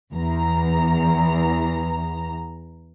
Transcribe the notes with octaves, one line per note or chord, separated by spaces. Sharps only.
E2 A#5